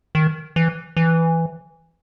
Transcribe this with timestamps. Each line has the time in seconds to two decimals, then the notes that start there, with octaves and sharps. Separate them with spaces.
0.15 D#3
0.56 E3
0.97 E3